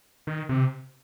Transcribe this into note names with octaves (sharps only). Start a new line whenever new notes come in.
D#3
C3